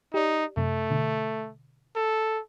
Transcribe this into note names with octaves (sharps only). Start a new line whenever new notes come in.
D#4 G4 D5
F#2 C3 A3
B2 D3
A4